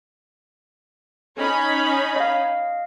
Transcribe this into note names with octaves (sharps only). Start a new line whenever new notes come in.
C#4 D#4 C#5 B5
D#5 F5